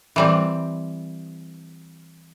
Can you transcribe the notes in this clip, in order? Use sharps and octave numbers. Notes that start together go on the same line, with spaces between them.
E3 G3 C4